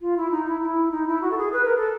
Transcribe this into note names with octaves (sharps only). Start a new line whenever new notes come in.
F4
E4
D#4
E4
E4
D#4
E4
F#4
A4
G#4
B4
A#4
A4